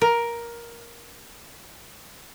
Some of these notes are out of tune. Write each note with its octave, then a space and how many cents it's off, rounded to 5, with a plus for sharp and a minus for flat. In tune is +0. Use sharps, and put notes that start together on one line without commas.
A#4 +10